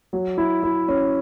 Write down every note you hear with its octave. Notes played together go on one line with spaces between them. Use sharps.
F#3
E4
E4
C#4